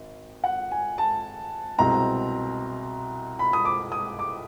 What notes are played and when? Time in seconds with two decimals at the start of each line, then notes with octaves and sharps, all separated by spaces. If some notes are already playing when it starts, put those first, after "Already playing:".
Already playing: G#1
0.44 F#5
0.72 G#5
0.98 A5
1.78 C2 B2 G#3 C4 A#5
3.39 B5
3.53 D#6
3.65 D6
3.92 D#6
4.19 D6